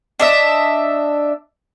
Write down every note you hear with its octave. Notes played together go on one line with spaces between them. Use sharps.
D4 D#5 E5